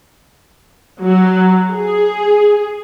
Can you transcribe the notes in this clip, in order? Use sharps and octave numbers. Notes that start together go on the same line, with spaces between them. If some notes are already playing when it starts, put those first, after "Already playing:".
F#3
G#4